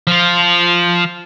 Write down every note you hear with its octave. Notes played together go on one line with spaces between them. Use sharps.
F3 F4